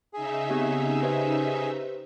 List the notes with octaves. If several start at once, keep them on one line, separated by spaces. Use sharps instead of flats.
C#3 D#4 G#4 E5
B3 C4 G4
G4 B4 C5